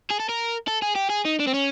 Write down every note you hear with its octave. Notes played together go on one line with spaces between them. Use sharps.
G#4
A4
A#4
A4
G#4
G4
G#4
D#4
D4
C4
C#4